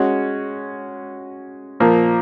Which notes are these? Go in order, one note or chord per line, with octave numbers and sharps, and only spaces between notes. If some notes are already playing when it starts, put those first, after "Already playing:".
Already playing: G#3 C#4 F#4
A#2 F3 A#3